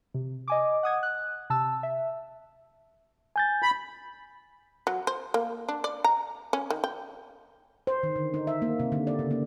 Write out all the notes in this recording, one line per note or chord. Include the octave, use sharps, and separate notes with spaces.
C3
D#5 G#5 D6
F#5 D#6 G#6
F#6
C3 A5 E6
E5
G#5 G6 A6
B5
F#3
C5
A#3
D4
D5
A#5
C#4
D#3
G5
C5
D#3
D3
D#4
E5
A#3
C3
D3
D5
C#3
A#3